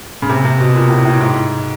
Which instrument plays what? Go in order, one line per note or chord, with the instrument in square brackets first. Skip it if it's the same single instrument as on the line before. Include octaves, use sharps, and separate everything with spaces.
[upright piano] C#3
C3
C3
B2
A#2
A2
A2
G#2